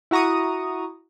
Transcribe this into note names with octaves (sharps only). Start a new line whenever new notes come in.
E4 F#4 A#5 C#6 D#6